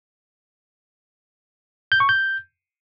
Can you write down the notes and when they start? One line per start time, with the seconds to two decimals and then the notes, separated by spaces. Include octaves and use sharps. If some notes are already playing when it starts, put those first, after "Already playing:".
1.92 G6
2.00 C#6
2.09 G6